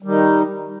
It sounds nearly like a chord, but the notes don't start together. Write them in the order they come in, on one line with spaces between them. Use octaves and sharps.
G3 D#3 D#4